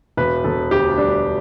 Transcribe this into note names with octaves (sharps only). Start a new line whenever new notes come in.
E1 B4
E1 A4
D2 G4
G3 D4